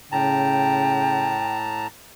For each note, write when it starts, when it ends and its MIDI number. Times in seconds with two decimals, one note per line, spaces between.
0.12 1.87 45
0.12 1.43 49
0.12 1.58 79
0.12 1.87 81
0.12 1.87 82